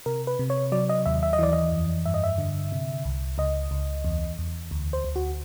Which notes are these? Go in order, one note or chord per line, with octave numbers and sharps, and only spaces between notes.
C3 A#4
B4
C3
C#5
F#3 D5
D#5
D#2 E5
E5
D#5
E3 D5
D#5
F2
G2 E5
D#5
E5
D3
C3
C2
C#2 D#5
C#2
E2
E2
D2
C5
D2
F#4